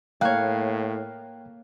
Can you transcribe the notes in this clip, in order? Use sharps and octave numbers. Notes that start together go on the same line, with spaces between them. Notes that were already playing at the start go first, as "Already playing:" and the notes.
A2 A#3 C#5 F5 G5 F#6